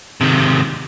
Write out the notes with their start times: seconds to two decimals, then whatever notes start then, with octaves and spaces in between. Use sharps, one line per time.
0.21 C3 D#3